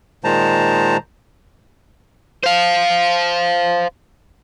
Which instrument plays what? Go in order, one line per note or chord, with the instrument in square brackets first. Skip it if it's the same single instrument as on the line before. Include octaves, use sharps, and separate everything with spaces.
[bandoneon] A#2 D#3 G#3 C5 A5 A#5
[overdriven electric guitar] C5 F5